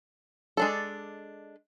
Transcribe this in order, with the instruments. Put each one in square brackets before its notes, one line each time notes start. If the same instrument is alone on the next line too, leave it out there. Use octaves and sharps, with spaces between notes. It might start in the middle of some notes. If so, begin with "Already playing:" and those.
[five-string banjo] G#3 D4 A4